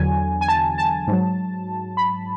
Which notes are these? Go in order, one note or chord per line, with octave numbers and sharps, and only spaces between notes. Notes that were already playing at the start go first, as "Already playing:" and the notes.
Already playing: E2 D3 F#3 G#5
G#5
A5
A5
G#2 F#3
B5